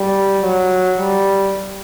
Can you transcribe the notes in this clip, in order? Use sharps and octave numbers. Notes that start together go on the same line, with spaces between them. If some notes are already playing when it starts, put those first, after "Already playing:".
Already playing: G3
F#3
G3